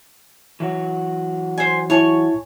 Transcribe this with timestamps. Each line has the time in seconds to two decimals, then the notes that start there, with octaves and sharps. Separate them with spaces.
0.60 E3 F#3 F#4
1.58 C5 D5 G#5
1.90 E4 C#5 G#5 A5 C#6